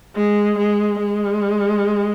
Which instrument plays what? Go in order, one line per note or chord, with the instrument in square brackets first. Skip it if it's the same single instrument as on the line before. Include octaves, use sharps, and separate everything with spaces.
[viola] G#3
G#3
G#3